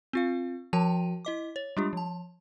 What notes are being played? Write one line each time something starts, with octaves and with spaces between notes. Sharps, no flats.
C4 F4 F5
F3 F#4 A#4 G5 A5 D#7
E4 D#5 D6
C#5
G3 G#3 D4 F4 G4
F3 A5